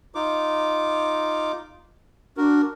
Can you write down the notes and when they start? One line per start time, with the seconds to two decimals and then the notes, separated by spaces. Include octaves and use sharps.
0.15 D#4 F4 D6
2.37 D4 F#4 A#4